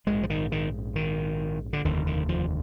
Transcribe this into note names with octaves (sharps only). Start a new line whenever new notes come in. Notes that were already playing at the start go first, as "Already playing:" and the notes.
A#1 G#2 G#3
F3
D#3
D#3
D#3
D3
F1 D#2 D3 D#3
D#3
F3